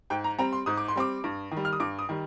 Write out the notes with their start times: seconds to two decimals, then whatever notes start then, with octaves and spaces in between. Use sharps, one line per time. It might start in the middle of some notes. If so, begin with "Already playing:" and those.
0.10 G#2 G5
0.24 A#5
0.38 G3 C4 A#5
0.53 C6
0.66 G#2 D#6
0.77 D6
0.88 C6
0.95 G3 C4 D6
1.24 G2
1.51 D#3
1.57 G3
1.65 F6
1.73 D#6
1.80 G2 D6
1.99 D#6
2.09 D#3 G3